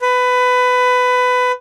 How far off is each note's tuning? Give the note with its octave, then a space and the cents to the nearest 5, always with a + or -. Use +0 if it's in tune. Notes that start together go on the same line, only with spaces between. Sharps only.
B4 +20